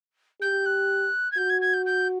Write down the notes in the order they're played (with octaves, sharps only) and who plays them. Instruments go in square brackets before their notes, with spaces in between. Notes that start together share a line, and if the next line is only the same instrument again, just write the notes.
[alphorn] G4 [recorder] G6
[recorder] F#6
G#6
[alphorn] F#4 [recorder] G6
[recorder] G#6
G#6
G6
G6